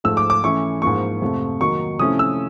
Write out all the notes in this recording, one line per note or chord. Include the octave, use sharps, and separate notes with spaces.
G#2 F3 A3 E6
D6
D6
E3 A3 C#4 E4 C#6
G#2 F3 A#3 C#6
F2 C3 F3 A3
D#3 F#3 A#3 D#4 C#6
C3 F3 A3 C#4 E4 D#6
E6